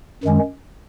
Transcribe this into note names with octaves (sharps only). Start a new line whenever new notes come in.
F#2 D#3 G#3 C#4